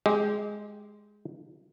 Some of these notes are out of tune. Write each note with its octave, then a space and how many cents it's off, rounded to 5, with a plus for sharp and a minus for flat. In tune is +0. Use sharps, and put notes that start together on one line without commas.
G#3 +0 G4 +0 D#5 +40